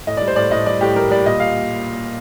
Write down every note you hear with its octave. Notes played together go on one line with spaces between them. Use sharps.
A2 D#5
D5
G3
C5
A2 D5
A2 D#5
G3 D5
A2 G4
G3 A#4
G3 D5
A#2 D#5
A#2 F5